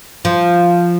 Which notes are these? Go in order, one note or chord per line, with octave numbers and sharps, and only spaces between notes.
F3